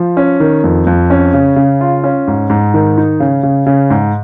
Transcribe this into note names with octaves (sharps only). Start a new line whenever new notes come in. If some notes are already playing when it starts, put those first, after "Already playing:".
Already playing: F3
C#4
D#3
F2
F2
C#4
C#3
C#3
F4
C#4
G#2
G#2
D#3
D#4
C#3
C#3
C#3
G#2